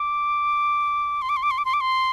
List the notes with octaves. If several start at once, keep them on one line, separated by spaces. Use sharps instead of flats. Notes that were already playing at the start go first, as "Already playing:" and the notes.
Already playing: D6
C6
D6
C6
D6
C6
D6
C6
D6
C6